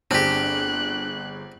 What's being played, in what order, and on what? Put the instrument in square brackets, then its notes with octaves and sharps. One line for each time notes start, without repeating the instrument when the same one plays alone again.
[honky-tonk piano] G1 G#4 [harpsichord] C4 G4 [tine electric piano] D4 [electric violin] F#6